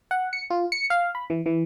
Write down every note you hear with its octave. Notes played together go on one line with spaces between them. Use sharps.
F#5
C#7
F4
C#7
F5
B5
E3
E3